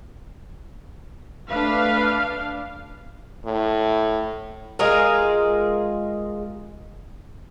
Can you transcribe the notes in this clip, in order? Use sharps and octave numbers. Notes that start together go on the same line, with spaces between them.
A3 D4 B4 F5
A2
G#3 F4 G#4 A#4